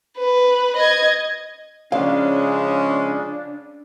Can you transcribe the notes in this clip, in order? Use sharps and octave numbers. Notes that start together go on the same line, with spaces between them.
B4
D#5 G#6
C#3 F3 G#3 C#4 D4 F5